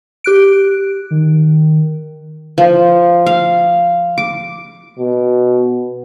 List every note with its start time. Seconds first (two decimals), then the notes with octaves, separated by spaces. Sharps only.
0.24 G4 F#6 D7
1.11 D#3
2.58 F3
3.26 F5
4.18 D6
4.98 B2